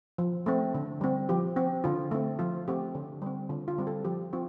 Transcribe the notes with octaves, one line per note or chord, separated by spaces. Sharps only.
F3
A3 C4
D3
G3 C4
F3 G4
C4
D3 F4
A3 C4
F3 F4
A3 C4 G4
D3
G3 C4
D3 F4
F4
G3 C4
A4
F3 G4
C4 F4